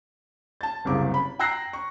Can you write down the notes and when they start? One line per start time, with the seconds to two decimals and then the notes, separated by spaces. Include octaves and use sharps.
0.61 A5 A6
0.85 F#1 C2 C#3 D6
1.14 B5
1.39 G5 A#5 E6 F#6 A#6 C7
1.73 C#6